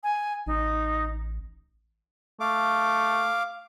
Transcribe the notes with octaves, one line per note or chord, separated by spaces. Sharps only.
G#5
A1 D#4
A3 F5 D6